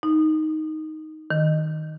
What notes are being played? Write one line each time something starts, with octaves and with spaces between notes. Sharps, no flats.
D#4
D#3